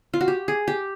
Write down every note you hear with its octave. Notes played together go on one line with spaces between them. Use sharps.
F4
F#4
G4
G#4
G4